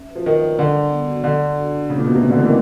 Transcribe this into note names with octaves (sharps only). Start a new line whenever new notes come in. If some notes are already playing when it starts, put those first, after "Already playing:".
Already playing: C#4 E5
B4
F3
D#3 F#4
D5
D3 G3
D4
B3
F#4
D3 D4
A4
F#4
D4
C#3 A3
A#2
B2 F4
C3
B2 C#4
D3
E3 A3
D#3